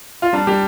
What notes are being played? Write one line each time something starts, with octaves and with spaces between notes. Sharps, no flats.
F4
G3 D4
G3 G4